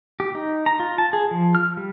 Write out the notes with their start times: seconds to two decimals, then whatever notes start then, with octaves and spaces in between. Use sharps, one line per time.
0.20 G4
0.35 D#4
0.66 A#5
0.80 F4
0.98 A5
1.13 G#4
1.31 F3
1.55 F6
1.77 G3